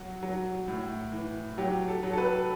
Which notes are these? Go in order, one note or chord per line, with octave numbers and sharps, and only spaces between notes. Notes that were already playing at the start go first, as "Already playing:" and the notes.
Already playing: F#3 F#4
F#3
A2
E3
F#3 G4
A4
F#3
A4
B4